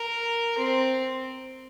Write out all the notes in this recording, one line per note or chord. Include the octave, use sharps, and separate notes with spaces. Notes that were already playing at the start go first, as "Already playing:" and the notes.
Already playing: A#4
C4